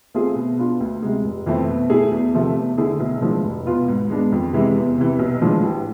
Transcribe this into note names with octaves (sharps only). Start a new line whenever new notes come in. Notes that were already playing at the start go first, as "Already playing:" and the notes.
A3 C4 F4 G#4
B2
B3 D4 F4
D2
C3 G#3
F1
F2 E3 A3 C4
B2
A3 E4 G#4
E2
C3 F3 A3
E2
D3 A3 E4 G#4
B1
A2 F3 G#3 D4
F1
E2 B2 B3 F4
G#2
G#3 B3 D4
F2
C3 E3 G#3
E2
C3 E3
B1
A2 F3 G#3 D4
A1